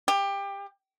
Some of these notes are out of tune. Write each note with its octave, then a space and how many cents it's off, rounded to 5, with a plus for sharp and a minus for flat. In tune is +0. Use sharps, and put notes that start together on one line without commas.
G4 +20